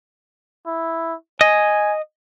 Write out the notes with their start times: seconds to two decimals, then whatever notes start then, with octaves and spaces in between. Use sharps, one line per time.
0.66 E4
1.41 D#5 G#5